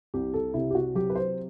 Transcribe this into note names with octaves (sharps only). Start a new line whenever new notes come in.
C2 G4
A4
C3 E4
G4
F#4
F#3 G4
B4
C5